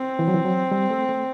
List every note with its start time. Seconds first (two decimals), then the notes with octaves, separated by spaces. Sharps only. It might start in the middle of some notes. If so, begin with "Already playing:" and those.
Already playing: C4
0.19 E3
0.28 F#3
0.34 E3
0.45 F#3
0.72 G3
0.90 A3
1.09 A3